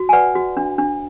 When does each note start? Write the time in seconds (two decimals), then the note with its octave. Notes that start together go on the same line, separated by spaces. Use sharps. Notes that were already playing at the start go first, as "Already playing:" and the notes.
Already playing: F#4
0.09 G#5
0.13 B4 D5 F#5
0.35 F#4
0.57 D4
0.78 D4